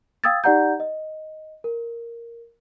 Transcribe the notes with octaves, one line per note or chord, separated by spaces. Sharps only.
F5 G5 D#6 E6 G#6 A6
D#4 G4 D5 F#5 A#5 G6
D#5
A#4